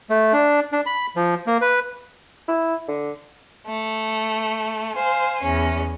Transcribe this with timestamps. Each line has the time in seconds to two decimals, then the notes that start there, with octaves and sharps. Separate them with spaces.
0.10 A3
0.33 D4
0.72 D4
0.86 B5
1.16 F3
1.47 A#3
1.61 B4
2.48 E4
2.88 D3
3.66 A3
4.93 C5 F5 G#5
5.41 E2 C#4